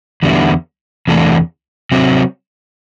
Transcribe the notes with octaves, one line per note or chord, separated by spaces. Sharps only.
E2 D3 G3 B3 E4
E2 C3 E3 A3 D4
C3 F#3 C4